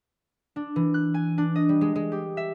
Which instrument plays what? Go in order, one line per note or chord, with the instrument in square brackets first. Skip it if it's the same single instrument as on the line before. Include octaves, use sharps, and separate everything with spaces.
[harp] D4
E3
F#6
G#5
D4
D#5
G3
G#3
G#3
G4
E5